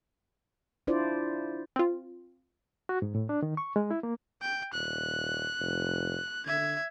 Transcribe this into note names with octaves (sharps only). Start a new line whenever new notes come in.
D4 E4 F4 C5 D5
C4 F4
F#4
G#2
A2
D4
D#3
C#6
G#3
E4
A#3
G5
D#1 F#6
F1
D3 E5 G#6